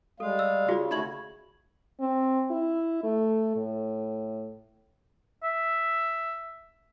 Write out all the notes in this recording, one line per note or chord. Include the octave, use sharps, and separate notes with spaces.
G3 G#3 A4 F5
E6
C#3 F4 F#4 G#4 D5
D3 A3 D#4 F#4 E5 B5 G#6 F#7
C4
E4
A3
A2
E5